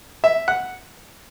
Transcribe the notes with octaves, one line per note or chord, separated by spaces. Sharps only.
E5
F#5